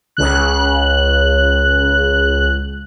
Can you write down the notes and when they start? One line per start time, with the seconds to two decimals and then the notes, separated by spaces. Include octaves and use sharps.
0.17 C#2 C#3 F#6